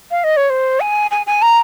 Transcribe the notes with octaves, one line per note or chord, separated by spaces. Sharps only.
F5
D#5
C#5
C5
G#5
G#5
G#5
A#5